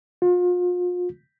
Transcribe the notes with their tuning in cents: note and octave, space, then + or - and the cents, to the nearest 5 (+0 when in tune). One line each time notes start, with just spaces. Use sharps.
F4 +35